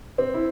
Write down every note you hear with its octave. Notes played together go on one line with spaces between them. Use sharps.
C4
E4